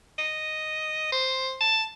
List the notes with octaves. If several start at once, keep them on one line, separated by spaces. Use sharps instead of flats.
D#5
C5
A5